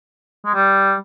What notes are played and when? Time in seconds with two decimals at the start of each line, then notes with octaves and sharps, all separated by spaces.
0.45 G#3
0.54 G3